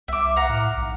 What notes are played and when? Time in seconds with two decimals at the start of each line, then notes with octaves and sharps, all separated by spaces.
0.08 C2 E5 D6
0.36 F5 F#5 A#5
0.49 A2
0.77 B1